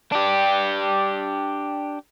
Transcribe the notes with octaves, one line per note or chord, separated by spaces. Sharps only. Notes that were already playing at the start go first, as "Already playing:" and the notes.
D4 G4